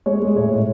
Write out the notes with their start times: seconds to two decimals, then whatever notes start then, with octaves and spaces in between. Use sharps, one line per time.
0.06 G#3 C#5
0.22 G#3
0.36 A2 C#5
0.51 A2